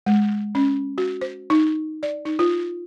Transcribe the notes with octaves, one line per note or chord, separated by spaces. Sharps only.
G#3
C#4
F#4
C5
D#4
D5
D#4
F4